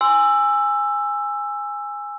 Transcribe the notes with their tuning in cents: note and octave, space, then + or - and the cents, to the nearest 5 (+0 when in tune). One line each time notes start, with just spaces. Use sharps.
G#5 -10 C6 +0 E6 +10